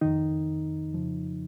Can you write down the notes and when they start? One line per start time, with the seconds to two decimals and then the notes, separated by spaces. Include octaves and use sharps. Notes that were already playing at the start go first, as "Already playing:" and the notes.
0.01 F2 D#3 D#4
0.94 F2 C#3 F3